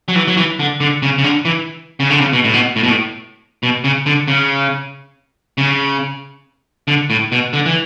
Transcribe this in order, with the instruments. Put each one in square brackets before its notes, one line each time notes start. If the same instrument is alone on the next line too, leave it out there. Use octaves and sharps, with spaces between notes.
[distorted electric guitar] F#3
E3
F#3
E3
D3
D3
C#3
C#3
D3
E3
C#3
D3
C#3
B2
A2
B2
A2
B2
A2
B2
C#3
D3
C#3
C#3
D3
A2
B2
D3
E3